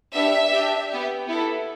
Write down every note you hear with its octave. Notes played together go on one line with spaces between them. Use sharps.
B3 D4 G4 E5
D4 G4
B3 G4
B3 E4 A4